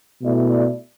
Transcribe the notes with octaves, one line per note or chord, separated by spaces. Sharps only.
B2 A3 E4 D5